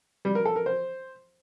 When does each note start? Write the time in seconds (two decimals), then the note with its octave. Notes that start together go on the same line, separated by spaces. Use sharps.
0.25 G3
0.35 A#4
0.45 A4
0.56 A#4
0.66 C5